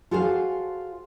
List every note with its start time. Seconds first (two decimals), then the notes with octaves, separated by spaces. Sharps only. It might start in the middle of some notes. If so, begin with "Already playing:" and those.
0.11 F4 F#4 G#4 A4 C5 F5